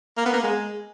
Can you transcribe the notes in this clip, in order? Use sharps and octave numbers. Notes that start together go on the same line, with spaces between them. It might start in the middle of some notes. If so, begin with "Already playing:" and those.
A#3
B3
A#3
G#3